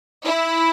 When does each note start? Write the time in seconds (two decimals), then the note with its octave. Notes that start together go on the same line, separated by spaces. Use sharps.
0.24 E4